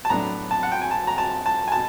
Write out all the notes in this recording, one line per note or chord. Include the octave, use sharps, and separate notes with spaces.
A5
A2 F#3 B3 D4 A#5
A5
F#5
G5
G#5
A5
A#5
A5
A5
G#5
B2 A5